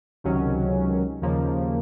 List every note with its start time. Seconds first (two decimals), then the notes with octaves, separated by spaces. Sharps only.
0.24 C#2 C3 D#3 F#3 C#4
1.22 D#2 C#3 F3 A#3